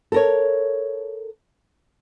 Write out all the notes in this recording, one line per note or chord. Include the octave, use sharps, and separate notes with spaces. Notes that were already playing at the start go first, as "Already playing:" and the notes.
A4 A#4 C#5